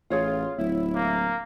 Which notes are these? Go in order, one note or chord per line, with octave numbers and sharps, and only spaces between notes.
A1 F4 G#4 C#5 F5
D1 E4
A#3